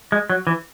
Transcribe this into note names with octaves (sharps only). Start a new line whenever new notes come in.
G#3
F#3
E3